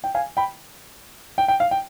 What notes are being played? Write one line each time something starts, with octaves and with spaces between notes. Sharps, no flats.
G5
F5 G#5
G5 B5
G5
G5
F5
G5